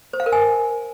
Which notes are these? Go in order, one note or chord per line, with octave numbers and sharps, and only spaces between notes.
C5
F5
A#4
G#5